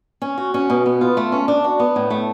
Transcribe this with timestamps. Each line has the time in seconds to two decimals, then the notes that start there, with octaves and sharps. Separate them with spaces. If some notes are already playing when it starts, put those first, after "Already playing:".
0.22 C#4
0.38 F#4
0.54 C#4
0.70 B2
0.86 B3
1.01 F4
1.17 A3
1.32 C#4
1.48 D4
1.64 F#4
1.80 B3
1.96 A2
2.10 A3